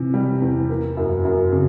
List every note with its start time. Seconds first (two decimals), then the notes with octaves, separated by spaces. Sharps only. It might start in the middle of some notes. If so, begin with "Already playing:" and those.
Already playing: C3 E3
0.14 G3
0.42 E2
0.69 A#3
0.97 F#2
1.25 F#2
1.52 C#3